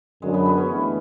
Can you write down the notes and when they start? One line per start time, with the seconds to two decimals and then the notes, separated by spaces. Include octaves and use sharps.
0.22 F#2 D3 F#3 G#3
0.34 B3
0.45 B3
0.57 C#4
0.69 E3 A3 D4